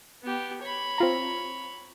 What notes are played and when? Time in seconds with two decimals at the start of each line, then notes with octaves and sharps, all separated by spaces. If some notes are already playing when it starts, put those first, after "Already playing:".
0.23 B3 G4
0.62 C#5 B5
0.98 C4 F4 A#5